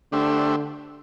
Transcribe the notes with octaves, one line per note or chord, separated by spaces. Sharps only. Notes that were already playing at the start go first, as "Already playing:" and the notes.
D3 A3 D4 G4 C5 E5